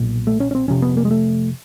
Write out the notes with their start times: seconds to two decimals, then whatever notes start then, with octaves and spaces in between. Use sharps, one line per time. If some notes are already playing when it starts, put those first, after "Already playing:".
Already playing: B1 A#2
0.27 A3
0.40 C#4
0.51 C#4
0.55 C4
0.68 F1 F2 C3 C#4
0.82 B3
0.97 A#3
1.05 G#3
1.11 A3